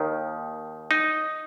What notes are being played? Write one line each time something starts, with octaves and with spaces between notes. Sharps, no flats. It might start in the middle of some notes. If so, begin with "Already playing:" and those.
Already playing: D#2 D#3
D#4